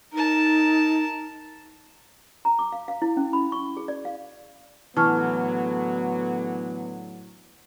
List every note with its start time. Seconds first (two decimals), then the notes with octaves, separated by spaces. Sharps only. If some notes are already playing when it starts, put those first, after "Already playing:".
0.13 D#4 A#4 A5
2.45 A#5
2.59 D6
2.72 F5
2.88 F5
3.02 E4
3.17 C#4
3.33 B5
3.52 C#6
3.77 G#4
3.88 D5
4.05 F5
4.97 A2 D3 E3 F#3 B3 A5 C#6 F6